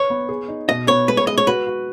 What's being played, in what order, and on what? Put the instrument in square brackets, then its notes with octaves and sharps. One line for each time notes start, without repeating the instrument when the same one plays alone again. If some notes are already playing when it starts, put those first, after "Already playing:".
Already playing: [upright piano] B4 [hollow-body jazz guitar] C#5
[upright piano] B3
G#4
D#4
[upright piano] B2 [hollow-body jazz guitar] D#5
[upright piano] B3 [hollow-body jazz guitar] C#5
[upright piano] G#3 [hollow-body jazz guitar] B4
[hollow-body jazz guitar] C#5
[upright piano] G#3 [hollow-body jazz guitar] D#5
[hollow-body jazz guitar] C#5
[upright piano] F#4 [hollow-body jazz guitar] B4
[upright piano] F#4